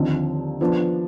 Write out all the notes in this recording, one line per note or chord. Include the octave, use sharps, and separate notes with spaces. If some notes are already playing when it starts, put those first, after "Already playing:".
Already playing: D#2 D3 F3 C4 D#4
F3 B3 D4